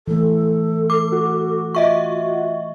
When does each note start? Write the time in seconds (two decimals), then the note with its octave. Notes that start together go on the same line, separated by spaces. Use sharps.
0.08 E3 A3 A4
0.90 D6
1.12 F#4
1.75 F4 D#5 E5 C#6